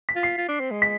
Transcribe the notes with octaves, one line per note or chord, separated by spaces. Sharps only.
B6
F4
C7
F4
D4
C4
G#3
B6